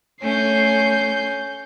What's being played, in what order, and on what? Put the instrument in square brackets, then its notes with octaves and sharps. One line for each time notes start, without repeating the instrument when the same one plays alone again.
[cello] A3 [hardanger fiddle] C#4 [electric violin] G6 C7